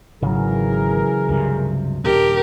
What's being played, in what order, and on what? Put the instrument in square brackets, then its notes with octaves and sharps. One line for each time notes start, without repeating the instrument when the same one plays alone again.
[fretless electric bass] G#1 [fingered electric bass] C#3 F#3 [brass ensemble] E3 G#4 A#4
[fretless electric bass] C#2 G2 C3
[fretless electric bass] D#1 C#4 D4 [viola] G4 A#4